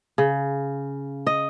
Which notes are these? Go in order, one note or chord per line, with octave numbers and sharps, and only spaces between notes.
C#3
D#5